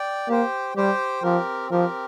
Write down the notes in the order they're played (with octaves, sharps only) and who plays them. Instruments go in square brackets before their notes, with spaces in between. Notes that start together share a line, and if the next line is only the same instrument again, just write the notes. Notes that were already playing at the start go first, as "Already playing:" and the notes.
Already playing: [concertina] D5 G5
[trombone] A#3 [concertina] G4 C5 G5
[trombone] G3 [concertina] G4 C5 G5
[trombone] F3 [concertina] C4 G4 A#4
[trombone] F3 [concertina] C4 G4 A#4